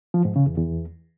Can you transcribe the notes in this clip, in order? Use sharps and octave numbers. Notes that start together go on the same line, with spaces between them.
F3
G#2
C#3
E2
E2